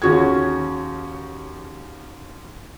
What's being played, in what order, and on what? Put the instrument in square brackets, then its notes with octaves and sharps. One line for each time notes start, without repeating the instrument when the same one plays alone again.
[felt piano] D#2 C#4 F#4 G#4 G#6